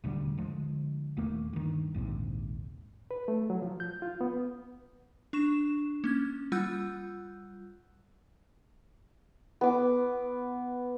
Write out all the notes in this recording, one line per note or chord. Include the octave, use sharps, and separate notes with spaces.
D#1 D2 D3 G3
D3 F3 G#3
D#1 D#2 A3 A#3
G2 D#3
A#1 D#2 G#2 C3
B4
A3
F#3
F3
G6
F4
B3
D4 C#6 E7
A#3 C#4 G#6
G3 F4 F#5 E6 F#6 G6
B3 D6